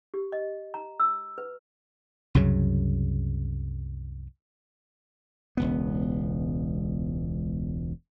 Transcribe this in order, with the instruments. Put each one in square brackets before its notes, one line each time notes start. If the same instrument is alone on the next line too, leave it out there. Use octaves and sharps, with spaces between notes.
[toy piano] G4
D#5
A#5
E6
B4
[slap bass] C2 F#2 C#3 F#3
E1 C#2 B3